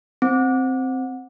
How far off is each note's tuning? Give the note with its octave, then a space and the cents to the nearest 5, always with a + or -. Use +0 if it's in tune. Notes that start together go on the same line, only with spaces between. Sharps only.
C4 +0